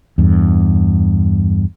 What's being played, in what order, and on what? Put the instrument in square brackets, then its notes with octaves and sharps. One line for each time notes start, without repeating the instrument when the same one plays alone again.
[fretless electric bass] E2 G2